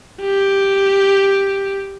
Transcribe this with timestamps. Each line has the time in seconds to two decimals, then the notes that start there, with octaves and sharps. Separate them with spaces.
0.22 G4